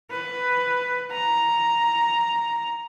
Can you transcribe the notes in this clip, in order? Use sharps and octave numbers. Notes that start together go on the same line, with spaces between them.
B4
A#5